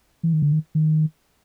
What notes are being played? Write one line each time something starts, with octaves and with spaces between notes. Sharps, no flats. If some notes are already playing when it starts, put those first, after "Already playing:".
E3
D#3
D3
D#3
D#3